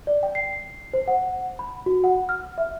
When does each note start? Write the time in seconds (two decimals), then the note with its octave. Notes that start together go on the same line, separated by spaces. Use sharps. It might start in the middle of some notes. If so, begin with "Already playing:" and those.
0.07 D5
0.23 G5
0.35 C7
0.94 C5
1.08 F#5
1.59 B5
1.86 F#4
2.04 F#5
2.29 F6
2.58 E5